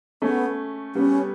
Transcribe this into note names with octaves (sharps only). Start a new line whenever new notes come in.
A3 B3 C#4
G3 B3 C#4